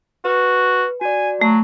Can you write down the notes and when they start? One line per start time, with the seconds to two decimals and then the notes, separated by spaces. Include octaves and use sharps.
0.25 F#4 B4
1.01 F#4 D5 G#5
1.41 F#3 A3